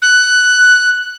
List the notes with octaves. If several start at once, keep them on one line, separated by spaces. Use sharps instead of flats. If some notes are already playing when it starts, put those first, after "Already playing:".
F#6